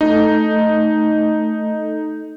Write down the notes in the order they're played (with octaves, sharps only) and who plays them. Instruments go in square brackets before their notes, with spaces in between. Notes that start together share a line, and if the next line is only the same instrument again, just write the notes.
[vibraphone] A3 A4 [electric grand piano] D#4